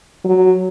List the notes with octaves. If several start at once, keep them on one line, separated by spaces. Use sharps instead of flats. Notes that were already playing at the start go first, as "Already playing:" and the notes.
F#3